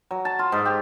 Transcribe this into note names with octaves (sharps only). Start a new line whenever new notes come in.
F#3
A5
F4
G#2
G4